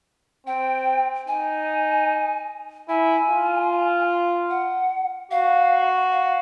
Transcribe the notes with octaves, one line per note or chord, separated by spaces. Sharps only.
C4 G5
D#4 G#5
E4 G#5
F4
F#5
F#4 F5
F5